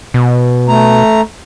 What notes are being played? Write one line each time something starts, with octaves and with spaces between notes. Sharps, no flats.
B2
A3 A#5